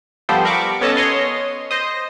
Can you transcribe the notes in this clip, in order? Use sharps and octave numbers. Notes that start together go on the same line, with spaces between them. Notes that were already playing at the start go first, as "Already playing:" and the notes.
F3 G3 B3 G4 A4 C5
A#4 B5 C#6 D6
B3 C#4 A4 D#5 A5
C#5 D#5 C6
C5 D#5